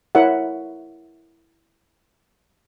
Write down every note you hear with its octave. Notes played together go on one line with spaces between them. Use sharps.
E4 A#4 C#5 E5 F#5